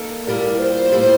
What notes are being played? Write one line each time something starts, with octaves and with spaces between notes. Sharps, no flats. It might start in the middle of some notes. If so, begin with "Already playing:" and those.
Already playing: A#3 D#4 A4
A2 G3 A#3 F4 A#4
C5
A2 G3 A#3 F4